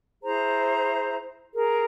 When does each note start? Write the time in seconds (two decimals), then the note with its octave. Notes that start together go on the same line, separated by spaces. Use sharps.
0.23 E4 G#4 C5 A#5
1.53 G#4 A#4